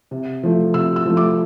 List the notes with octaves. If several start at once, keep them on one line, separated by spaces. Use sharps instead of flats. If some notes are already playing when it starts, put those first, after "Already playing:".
C3
F3 A3
C3 E6
E6
F3 A3
D6